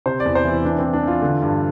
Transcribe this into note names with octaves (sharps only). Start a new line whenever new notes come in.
C3 C5
D5
E2
C5
E3 E4
E3 D4
C4
E3
D4
E3 F4
D3
G2